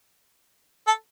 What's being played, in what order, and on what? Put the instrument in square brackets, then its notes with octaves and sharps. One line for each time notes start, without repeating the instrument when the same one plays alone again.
[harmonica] A4